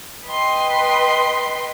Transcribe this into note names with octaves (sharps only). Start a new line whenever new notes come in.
B4 D#5 G5 C6